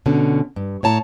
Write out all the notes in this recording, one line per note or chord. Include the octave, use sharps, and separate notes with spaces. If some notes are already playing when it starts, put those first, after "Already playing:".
B2 D3 C#4
G2
A2 C#5 A5 A#5